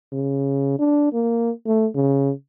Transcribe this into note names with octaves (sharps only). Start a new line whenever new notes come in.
C#3
D4
A#3
A3
C#3